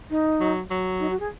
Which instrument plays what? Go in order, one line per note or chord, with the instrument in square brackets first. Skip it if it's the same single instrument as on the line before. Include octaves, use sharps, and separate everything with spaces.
[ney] D#4
[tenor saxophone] F#3
F#3
[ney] D#4
F#4
G#4